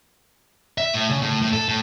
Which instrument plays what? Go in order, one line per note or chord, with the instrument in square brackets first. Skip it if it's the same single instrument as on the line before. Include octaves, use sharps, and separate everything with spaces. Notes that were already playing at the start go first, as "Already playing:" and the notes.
[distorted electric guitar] E5
A2
C#3
A2
A2
A4
A2